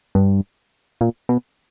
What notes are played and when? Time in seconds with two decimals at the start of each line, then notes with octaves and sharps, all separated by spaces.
0.15 G2
1.01 A#2
1.29 B2